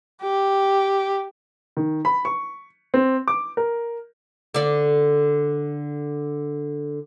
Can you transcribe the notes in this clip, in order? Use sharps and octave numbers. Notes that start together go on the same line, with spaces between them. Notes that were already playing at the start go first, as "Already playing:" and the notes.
G4
D#3
B5
C#6
C4
D6
A#4
D3 D5